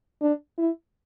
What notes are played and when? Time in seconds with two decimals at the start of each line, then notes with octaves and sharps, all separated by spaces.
0.21 D4
0.58 E4